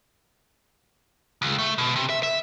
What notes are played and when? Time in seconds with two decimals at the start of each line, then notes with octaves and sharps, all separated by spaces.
1.42 C#2
1.59 A3
1.78 B2
1.96 C3
2.09 E5
2.23 E5